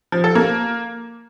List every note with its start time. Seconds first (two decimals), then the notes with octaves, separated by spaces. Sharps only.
0.12 F3
0.24 A4
0.35 A#3